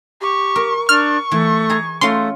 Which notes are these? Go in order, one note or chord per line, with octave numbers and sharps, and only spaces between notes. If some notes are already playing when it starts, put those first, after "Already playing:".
G4 C#6
A#4
D4 C#6 F6
E3 A3
G#4 A#5
A3 C#4 F4 A#5 C6